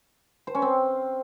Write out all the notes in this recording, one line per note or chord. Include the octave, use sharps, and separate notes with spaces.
C5
C#4
C4